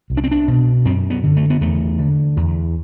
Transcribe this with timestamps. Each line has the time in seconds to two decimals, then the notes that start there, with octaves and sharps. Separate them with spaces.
0.10 C2
0.17 D4
0.24 C4
0.31 D4
0.48 B2
0.85 F#2 C4
1.10 B3
1.23 D3
1.37 A3
1.50 B3
1.61 E2 A3
1.99 D3
2.37 E2